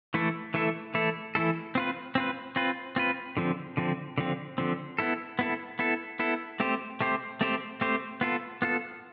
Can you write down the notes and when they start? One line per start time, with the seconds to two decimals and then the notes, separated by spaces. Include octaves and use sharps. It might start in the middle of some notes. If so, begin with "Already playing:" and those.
0.14 E3 A3 E4 A4
0.54 E3 A3 E4 A4
0.94 E3 A3 E4 A4
1.35 E3 A3 E4 A4
1.75 C4 F4 B4
2.15 C4 F4 B4
2.56 C4 F4 B4
2.96 C4 F4 B4
3.37 D3 F3 C4
3.77 D3 F3 C4
4.18 D3 F3 C4
4.58 D3 F3 C4
4.99 B3 E4 A4
5.39 B3 E4 A4
5.79 B3 E4 A4
6.19 B3 E4 A4
6.60 A3 C4 G4 C5
7.01 A3 C4 G4 C5
7.41 A3 C4 G4 C5
7.81 A3 C4 G4 C5
8.21 B3 F4 A4
8.62 B3 F4 A4